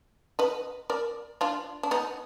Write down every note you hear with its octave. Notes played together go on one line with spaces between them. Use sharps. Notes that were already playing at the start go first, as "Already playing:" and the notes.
B4 D#5
A#4 D5
D4 F4
D4
B3 D#4